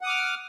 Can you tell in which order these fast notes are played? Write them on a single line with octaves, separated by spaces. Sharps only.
F#5 D#6 D6 F6